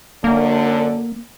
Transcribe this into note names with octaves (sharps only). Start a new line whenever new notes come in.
F#2 D3 A#3